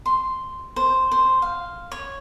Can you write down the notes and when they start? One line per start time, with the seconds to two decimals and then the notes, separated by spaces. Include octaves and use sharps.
0.06 C6
0.76 C5
1.12 C5
1.42 F5
1.91 C#5